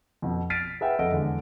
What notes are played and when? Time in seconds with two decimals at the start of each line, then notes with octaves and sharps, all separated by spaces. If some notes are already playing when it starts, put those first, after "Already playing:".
0.22 F2 B2
0.50 F6 A6 B6 C7 D7 D#7
0.81 G#4 B4 E5 F#5 G5
0.99 F2 A4 D#5 F#5 D7
1.12 E2 D3 G#3